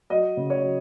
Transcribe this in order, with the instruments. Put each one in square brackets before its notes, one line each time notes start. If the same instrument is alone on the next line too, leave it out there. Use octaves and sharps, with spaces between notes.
[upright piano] F#3 D#5
C#3
C#5
F#3